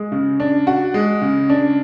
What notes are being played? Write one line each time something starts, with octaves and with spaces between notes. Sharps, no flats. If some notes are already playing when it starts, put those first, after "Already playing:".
Already playing: G#3
C#3
D4
F#4
G#3
C#3
D4